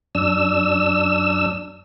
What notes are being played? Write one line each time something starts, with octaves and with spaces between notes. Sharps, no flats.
F#2 D4 E6